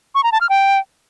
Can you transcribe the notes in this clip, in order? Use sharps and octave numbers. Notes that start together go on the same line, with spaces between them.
C#6
A#5
A5
F6
G5